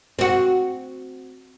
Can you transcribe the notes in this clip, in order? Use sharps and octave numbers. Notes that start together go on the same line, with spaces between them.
C4 F#4